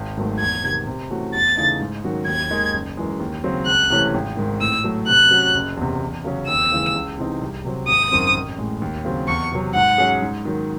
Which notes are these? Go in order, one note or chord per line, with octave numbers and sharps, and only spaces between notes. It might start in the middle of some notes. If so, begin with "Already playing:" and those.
Already playing: G#1
G#2 D#3 F#3 A3
E2 G#6
C3 D#3
C3
E3 A3 C#4 F#4
E2 A6
C#3 E3 A3 D#4
G#2
D#3 F#3 C#4 F#4
D#2 G#6
D#3 G#3 D#4
F#1
F#2 E3 G#3
D#2
C#3 F#3 C4
C#2 F#6
C3 E3 A3 C#4
G#1
G#2 D#3
A2 E6
F#3 A3
C3 F#6
F#3 C#4 F#4
F#1
E2 C3
E2
C#3 F#3 C#4 G#4
D#2 E6
C#3 E3 G#3
C#2
C3 E3 C4 D#4
C2
C3 F#3 C4
G#1 D#6
F#2 D#3 F#3 C4
A1
A2 G#3
D#2
C#3 F#3 C4
E2 C#6
C3 F#3
G#2 F#5
F#3 C#4 G#4
G#2
D#3 F#3